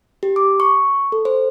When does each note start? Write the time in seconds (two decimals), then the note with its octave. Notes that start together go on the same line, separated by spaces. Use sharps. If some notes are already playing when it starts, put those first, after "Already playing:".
0.23 G4
0.36 D6
0.60 C#6
1.12 A4
1.25 C5